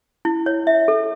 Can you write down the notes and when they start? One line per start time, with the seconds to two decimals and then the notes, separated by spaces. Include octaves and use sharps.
0.25 E4
0.46 C#5
0.67 E5
0.88 A4